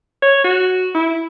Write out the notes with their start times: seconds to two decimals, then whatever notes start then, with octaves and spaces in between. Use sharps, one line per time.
0.22 C#5
0.44 F#4
0.95 E4